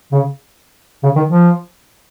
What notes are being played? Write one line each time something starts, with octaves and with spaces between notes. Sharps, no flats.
C#3
C#3
D#3
F3